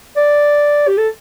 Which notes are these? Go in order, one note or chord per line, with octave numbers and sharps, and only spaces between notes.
D5
G4
A4